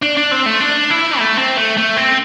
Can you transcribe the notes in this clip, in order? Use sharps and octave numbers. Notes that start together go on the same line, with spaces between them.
D4
D4
C4
A3
D4
E4
A3
C4
A3
A3
C4